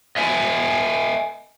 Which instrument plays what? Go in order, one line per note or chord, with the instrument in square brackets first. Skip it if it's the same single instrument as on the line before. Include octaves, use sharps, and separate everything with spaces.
[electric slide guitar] D#5 E5 G#5